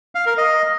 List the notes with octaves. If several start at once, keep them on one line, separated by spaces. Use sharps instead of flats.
F5
A#4
D#5